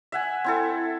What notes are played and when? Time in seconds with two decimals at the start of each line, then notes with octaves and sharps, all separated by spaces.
0.12 E5 F#5 G#5
0.44 C4 E4 A4